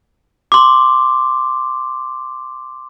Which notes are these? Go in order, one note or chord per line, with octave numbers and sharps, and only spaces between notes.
C6 D6